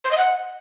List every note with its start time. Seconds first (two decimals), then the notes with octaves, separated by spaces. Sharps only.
0.04 C5
0.11 D#5
0.17 F#5